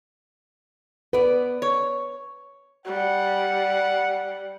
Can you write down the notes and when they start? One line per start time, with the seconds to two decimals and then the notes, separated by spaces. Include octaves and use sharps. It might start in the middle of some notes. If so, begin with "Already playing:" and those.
1.13 B3 B4 D5
1.62 C#5
2.86 G3 F#5